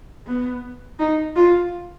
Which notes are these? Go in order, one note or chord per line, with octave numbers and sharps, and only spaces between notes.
B3
D#4
F4